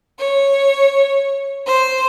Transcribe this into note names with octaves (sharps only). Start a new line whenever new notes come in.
C#5
C5